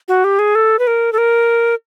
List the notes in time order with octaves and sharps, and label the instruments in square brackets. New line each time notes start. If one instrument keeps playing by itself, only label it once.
[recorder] F#4
G4
G#4
A4
B4
A#4
A4
A#4